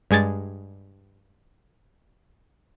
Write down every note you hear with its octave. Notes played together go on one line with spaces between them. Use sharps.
G2 G#3 G#6 A6